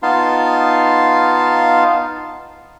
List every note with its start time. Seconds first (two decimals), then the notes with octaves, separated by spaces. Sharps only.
0.03 B3 D#4 F4 F5 A5 C6